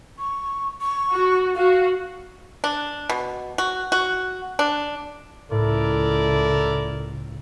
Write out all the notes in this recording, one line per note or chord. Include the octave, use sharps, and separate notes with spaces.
C#6
C#6
F#4
F#4 F5
D4
B2
F#4
F#4
D4
C#2 A2 E4 A4 A#4 D5